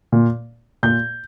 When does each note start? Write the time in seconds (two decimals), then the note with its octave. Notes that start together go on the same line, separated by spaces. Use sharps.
0.12 A#2
0.83 A#2 G6